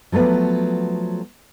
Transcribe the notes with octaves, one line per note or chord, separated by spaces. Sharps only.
F3 F#3 A3 B3